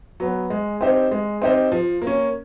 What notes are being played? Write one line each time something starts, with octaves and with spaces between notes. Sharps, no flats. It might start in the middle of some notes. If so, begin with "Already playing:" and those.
F#3 B3
G#3
C4 D#4 G4 C5
G#3
C4 D#4 G4 C5
F3
A#3
C#4